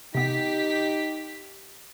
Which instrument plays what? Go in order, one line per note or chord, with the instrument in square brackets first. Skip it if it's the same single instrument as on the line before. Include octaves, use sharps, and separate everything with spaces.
[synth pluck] C3 B3 [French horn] D#4 [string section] G4 B6